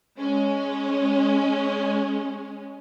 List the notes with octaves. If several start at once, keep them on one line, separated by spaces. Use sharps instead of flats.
G#3 C#4